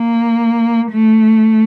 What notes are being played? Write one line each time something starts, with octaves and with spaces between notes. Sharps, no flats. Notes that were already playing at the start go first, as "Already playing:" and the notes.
Already playing: A#3
A3